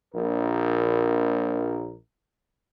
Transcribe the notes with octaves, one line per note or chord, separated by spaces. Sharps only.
A#1 A#4